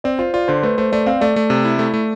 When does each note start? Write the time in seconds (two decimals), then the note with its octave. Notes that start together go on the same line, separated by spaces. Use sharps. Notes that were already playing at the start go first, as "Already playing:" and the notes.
0.04 C4 D5
0.19 F4 C5
0.34 F4 D5
0.48 D3 C5
0.62 A3 B4
0.78 A3 C5
0.92 A3 D5
1.06 C4 F5
1.21 A3 D5
1.36 A3
1.50 C3
1.65 E4
1.79 A3
1.94 A3